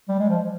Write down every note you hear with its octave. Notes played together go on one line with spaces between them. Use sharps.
G3
G#3
F3